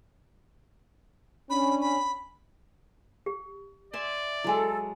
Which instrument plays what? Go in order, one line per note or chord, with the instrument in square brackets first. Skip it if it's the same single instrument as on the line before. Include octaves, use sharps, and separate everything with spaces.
[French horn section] C#4 D4 [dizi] B5
[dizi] B5
[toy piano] G4
[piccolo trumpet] D5 [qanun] E5 G#5 C6
[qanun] F#3 G#3 [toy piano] E4 G#5 [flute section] A4